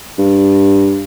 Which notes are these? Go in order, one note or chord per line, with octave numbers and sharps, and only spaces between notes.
G2